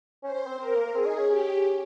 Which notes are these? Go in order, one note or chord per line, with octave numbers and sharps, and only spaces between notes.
C#4 C5
C#4
C4
C4 A#4
A#3
A#3
C4 G#4
D#4
C#4
C#4 G4